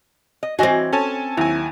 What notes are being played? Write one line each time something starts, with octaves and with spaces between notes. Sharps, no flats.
D#5
E3 C4 F#4 D#5 G#5
C#4 A4 G#5 A5
D#2 F#3 E4 G#5